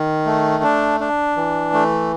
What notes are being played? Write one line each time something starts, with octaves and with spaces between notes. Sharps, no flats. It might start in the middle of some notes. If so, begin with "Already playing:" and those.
Already playing: D#3
A3
D4
D4
E3
A3